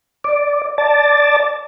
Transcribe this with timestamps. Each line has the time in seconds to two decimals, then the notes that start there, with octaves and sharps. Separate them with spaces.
0.24 D5
0.78 D5 A5